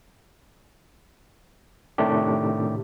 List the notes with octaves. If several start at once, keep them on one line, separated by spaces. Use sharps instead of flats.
A2 C3 D#3 A3 D4 G4